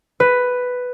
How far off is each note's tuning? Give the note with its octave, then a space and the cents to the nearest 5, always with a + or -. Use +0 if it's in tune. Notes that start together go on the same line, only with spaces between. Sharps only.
B4 +5